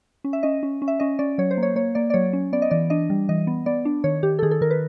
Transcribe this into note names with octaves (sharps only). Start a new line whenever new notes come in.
C#4
E5
C#4 D#5
C#4
C#4
E5
C#4 D#5
C#4 D5
F#3 C#5
C5
A#3
C#5
A#3 C#5
A#3 D5
D5
F#3 C#5
C#4
B3 D5
D#5
E3 D5
D4 D#5
G3
E3 D#5
B3
B3 D5
D4
D#3 C#5
D#3 G4
A4
D#3 G#4
A4
D#3 A#4
B4